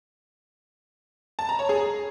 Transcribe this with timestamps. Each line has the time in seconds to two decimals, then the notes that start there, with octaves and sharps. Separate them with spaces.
1.39 A5
1.49 A#5
1.59 C#5
1.69 G#4